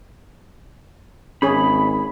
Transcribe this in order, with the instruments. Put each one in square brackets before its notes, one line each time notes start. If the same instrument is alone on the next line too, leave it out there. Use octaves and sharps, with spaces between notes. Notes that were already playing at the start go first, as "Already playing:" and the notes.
[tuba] G#1 [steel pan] C#4 G#4 C#5 [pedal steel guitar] B5